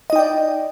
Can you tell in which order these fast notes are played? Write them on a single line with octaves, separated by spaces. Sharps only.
D#5 D#4 G5 D5